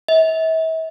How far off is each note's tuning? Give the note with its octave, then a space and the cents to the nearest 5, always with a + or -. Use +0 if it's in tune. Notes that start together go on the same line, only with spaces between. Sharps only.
E5 -40